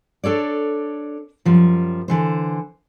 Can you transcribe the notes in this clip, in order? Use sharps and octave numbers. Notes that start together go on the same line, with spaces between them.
D4 A4 C#5 D5
F#2 F3 G3
D3 E3 C5